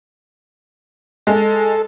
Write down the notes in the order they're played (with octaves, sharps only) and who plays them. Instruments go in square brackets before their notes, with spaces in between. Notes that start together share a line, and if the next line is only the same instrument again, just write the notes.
[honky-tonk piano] G#3 [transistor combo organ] A4